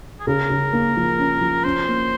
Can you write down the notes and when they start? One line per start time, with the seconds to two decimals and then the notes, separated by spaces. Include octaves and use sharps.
0.20 G#4
0.27 C#3 A#4
0.50 C#3
0.73 A#3
0.96 F3
1.18 C#4
1.41 F3
1.64 C#4 C5
1.88 A#3